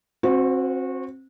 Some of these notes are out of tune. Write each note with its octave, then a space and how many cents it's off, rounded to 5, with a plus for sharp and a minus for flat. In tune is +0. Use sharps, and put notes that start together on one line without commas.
C4 +30 F#4 -25 C5 -25